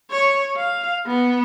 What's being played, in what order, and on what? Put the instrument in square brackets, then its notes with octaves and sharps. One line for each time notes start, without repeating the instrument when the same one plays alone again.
[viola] C#5
F5
B3